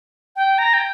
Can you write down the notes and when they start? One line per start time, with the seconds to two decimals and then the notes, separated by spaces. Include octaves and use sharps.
0.36 G5
0.58 A#5
0.74 G5